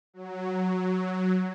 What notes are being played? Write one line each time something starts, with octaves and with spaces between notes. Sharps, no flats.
F#3